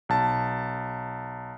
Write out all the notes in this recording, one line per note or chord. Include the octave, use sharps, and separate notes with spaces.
B1 A5